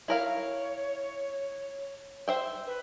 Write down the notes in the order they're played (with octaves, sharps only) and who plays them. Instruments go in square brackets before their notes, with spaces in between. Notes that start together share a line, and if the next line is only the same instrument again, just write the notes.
[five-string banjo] E4 A#4 F5 [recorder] C#5
[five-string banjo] C5 E5 G5
[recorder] B4